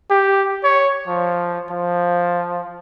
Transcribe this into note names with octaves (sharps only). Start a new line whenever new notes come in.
G4
C#5
F3
F3